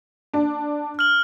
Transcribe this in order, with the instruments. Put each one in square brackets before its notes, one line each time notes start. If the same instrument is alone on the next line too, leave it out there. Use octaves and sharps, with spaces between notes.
[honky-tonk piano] D4
[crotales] F6 F#7